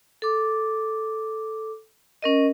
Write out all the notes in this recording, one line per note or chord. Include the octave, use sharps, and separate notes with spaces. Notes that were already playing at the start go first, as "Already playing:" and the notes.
A4 D6
C#4 A#4 D#5